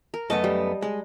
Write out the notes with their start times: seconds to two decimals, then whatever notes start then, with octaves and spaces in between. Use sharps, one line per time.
0.14 A#4
0.30 F#2 A3 B3 D#5 A5
0.44 G3
0.82 G#3